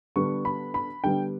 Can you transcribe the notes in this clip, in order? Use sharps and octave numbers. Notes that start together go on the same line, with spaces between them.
D3 G3 B3 D4 C#6
B5
B5
D3 G3 B3 D4 G5